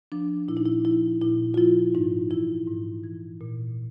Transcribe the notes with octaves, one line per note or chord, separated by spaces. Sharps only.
F3 D4
A#2 E4
D#4
E4
F3 E4
A#2 E4
F4
F3 E4
G#2 D#4
E3 E4
G#2
E3
A#2